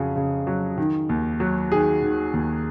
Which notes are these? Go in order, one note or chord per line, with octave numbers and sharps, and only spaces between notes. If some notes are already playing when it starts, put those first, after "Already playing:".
Already playing: F2 C#3 F#3 G#4
C#3
F#3
D#3
D#2
F#3
D#3 G#4
D#3
D#2